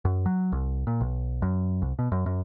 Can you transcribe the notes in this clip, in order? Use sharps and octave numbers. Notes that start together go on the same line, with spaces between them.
F#2
F#3
C2
A#2
B1
F#2
C2
B2
F#2
F#2